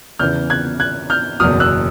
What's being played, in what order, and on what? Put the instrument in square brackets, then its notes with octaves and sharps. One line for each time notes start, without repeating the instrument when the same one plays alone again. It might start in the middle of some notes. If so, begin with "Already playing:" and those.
[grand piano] E2 C#3 E3 F6 G6
F#6 G#6
F#6 G#6
F6 G6
F#1 E2 B2 F#3 D#6 F6
E6 F#6